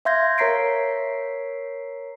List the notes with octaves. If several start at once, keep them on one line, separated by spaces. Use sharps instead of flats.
E5 F5 C6 G6 G#6 A#6
A#4 C#5 A#5 B6 C7 D7